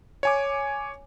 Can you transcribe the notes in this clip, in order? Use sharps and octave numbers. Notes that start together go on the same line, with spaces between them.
C#5 G#5 D6